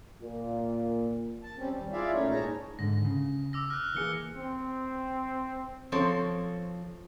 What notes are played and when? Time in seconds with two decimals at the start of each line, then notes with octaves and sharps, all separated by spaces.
0.20 A#2
1.43 A5
1.58 G3 C4 C#4
1.71 D#2 G3
1.92 E4 F4 G#4 D5 E5 F5
2.13 A#2 A3 C#4 D#4 E4 C#5
2.30 G#2 D#4 G#4 C#5 A5 A#5
2.79 G#2 D3 A#6
3.05 C#3
3.53 D6 E6 A#6
3.70 F6 F#6
3.95 E3 A#3 G#4 C#7 G7
4.36 C4
5.92 F3 C4 A4 C#5